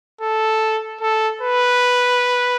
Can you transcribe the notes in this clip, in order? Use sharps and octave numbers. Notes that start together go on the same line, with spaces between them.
A4
A4
B4